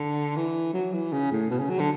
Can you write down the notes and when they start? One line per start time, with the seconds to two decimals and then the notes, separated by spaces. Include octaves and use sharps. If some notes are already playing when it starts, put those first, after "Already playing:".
Already playing: D3
0.37 E3
0.74 F#3
0.93 E3
1.13 C#3
1.31 A2
1.50 B2
1.59 C#3
1.70 F#3
1.79 D3